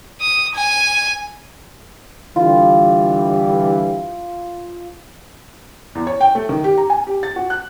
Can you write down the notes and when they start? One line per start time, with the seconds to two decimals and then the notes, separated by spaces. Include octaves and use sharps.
0.21 D#6
0.55 G#5
2.36 D3 E3 G3 F4
5.95 E2
6.07 C#5
6.21 G5
6.35 A3
6.49 D#3
6.64 G4
6.78 A#5
6.90 G#5
7.07 G4
7.23 A6
7.36 F#4
7.50 F#6